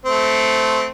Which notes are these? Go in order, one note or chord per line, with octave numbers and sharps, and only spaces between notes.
A3 C4